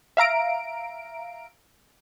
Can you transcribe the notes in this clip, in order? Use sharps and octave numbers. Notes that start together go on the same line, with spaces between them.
E5 F5 A#5 D7